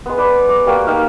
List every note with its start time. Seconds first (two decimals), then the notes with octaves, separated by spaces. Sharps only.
0.06 G#3 B3
0.18 B4 D5 B5
0.49 D6
0.66 G3 A#3 F#4
0.87 A#3 D#4 G4 F5